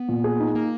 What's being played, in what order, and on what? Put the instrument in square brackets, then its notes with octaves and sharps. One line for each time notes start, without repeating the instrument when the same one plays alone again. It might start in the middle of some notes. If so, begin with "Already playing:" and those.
Already playing: [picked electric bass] B3
[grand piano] A#2
G#4
D#4
[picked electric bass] A#3